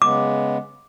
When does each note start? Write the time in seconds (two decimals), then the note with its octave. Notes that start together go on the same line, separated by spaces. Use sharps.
0.02 C#3 G#3 B3 D6